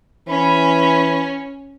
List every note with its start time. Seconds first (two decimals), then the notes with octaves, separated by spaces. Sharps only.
0.28 E3 C#4 B5